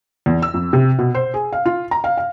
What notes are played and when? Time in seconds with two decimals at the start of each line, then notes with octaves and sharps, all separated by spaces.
0.26 E2
0.42 E6
0.54 F2
0.73 C3
0.98 B2
1.15 C5
1.34 G#4
1.53 F5
1.66 F4
1.91 A#5
2.04 F5
2.17 F5